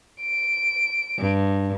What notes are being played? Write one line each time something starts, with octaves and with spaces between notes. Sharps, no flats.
D7
G2